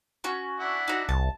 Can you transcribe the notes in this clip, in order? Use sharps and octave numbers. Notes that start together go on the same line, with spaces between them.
C#4 F#4
D4 E4 F#5
D#4 F#4
C2 A5